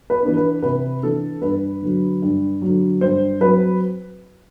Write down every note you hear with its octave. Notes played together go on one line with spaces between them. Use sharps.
B4
E3 B3 D4
B4
C3 B4
E3 B3 D4 A4
G2 B4
D3 F#3
G2
D3 F#3
G2 C5
F#3 C4 B4